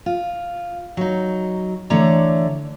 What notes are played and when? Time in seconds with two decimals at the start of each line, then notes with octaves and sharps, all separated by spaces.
0.06 F4
0.97 F#3 D#4
1.90 D3 E3 A3 C#5 D5 A#5